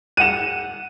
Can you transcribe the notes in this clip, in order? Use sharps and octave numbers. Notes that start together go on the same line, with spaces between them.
F#5 F#6 D#7 E7